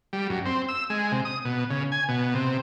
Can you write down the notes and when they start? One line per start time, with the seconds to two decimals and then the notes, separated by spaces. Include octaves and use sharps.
0.13 G3
0.29 F#2
0.46 C4
0.69 E6
0.90 G#3
1.12 C3
1.25 D#6
1.45 B2
1.70 C#3
1.92 G#5
2.08 B2
2.35 C3